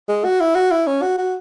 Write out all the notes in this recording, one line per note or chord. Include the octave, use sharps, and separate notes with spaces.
G#3
F#4
E4
F#4
E4
C#4
F#4
F#4